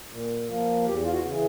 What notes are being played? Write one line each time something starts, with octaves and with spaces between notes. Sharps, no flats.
A#2
F3 A#3
E2 G4
F4
F#4
C#3 E3